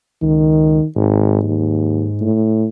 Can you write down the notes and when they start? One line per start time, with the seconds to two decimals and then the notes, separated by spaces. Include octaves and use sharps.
0.22 C#2 D#3
0.96 G#1 G#2
1.43 D#2
2.21 A2